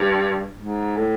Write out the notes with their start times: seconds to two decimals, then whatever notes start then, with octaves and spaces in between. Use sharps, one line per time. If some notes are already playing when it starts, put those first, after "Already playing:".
Already playing: G2
0.59 G#2
0.96 A2